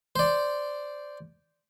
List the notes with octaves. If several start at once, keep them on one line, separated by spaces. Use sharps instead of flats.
C5 D5